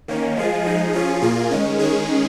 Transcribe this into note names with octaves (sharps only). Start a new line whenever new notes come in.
D#3 A#3 C#4
F3 G#3 F4 G#4
F3 G#3 D#4 G#4
F3 C#4 F4 G#4
A#2 A#3 F4 G#4
D#3 G#3 C#4
D#3 G#3 C#4 G#4